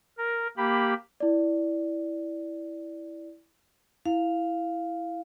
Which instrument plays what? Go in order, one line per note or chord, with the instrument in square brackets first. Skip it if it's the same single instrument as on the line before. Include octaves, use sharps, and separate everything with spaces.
[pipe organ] A#4
A#3 G4 B5
[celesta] E4 D5
[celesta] E4 [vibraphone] F5